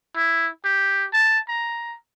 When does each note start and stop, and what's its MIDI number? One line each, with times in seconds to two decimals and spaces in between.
0.16 0.49 64
0.65 1.05 67
1.13 1.38 81
1.48 1.95 82